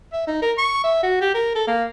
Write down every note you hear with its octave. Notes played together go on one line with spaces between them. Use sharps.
E5
D#4
A#4
C#6
E5
F#4
G4
A#4
A4
A#3